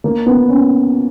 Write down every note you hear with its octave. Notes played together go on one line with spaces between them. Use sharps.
A#3
B3
C#4